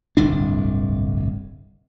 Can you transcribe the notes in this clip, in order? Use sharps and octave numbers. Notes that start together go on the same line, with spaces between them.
D1 G1 C2 D4